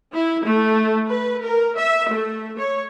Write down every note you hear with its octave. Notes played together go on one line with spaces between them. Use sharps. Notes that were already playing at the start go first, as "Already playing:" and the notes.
E4
A3
B4
A#4
E5
A3
C#5